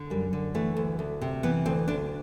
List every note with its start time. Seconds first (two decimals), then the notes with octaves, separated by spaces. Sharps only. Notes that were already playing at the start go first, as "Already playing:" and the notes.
Already playing: D3
0.10 F#2 G3
0.33 D3
0.54 E3 A3
0.77 D2
0.99 D2
1.21 C3
1.43 E3 B3
1.65 D2 C4
1.88 D2 D4